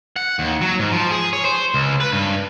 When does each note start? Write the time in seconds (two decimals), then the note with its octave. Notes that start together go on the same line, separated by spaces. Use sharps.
0.16 F#5
0.39 D#2
0.61 F#3
0.79 G#2
0.92 F3
1.11 G#4
1.33 C#5
1.45 C5
1.74 C#2
2.00 B4
2.12 G2